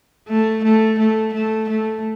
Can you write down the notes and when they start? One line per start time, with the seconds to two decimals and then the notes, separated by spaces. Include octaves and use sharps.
0.28 A3
0.64 A3
0.99 A3
1.34 A3
1.69 A3